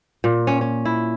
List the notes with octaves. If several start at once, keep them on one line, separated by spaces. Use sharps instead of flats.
A#2
C#4
C#4
E4